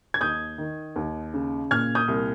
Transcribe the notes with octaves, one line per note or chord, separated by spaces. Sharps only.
G#6
D#2 D#6 G6
D#3
D#2
C#3
A#2 F6 G#6
D#6 G6
C2